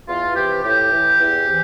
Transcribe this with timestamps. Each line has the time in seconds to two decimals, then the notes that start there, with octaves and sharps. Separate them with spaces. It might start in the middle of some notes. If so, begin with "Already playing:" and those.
0.08 E2 F4
0.36 C3 E3 G4
0.63 A2 G4
0.91 E3
1.19 E2
1.46 C3 E3